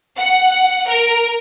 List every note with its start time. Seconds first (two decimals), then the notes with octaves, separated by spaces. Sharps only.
0.19 F#5
0.89 A#4